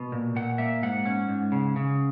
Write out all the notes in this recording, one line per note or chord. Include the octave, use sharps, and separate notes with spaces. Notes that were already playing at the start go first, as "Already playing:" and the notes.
Already playing: B2
A#2
A#2 F#5
A#3 E5
G#2 F#5
C#4
G#2
C#3
C#3